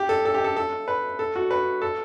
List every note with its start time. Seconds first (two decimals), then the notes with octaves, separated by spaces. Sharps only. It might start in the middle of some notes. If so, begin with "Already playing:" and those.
Already playing: G4
0.09 A4
0.25 A4
0.34 G4
0.44 A4
0.57 A4
0.88 B4
1.19 A4
1.36 F#4
1.51 B4
1.82 A4